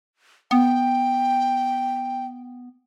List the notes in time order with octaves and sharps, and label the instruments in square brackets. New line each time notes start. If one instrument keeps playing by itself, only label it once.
[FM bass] B3 [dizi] G5